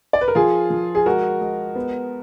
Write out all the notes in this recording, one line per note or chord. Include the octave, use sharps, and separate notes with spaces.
D5
B4
A#4
F3 F4 G#4
F3
G#4
G#3 F#4 A#4
G#3
B3